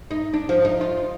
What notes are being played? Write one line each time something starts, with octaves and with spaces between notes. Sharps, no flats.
D#4
D4
F3
D#4
F4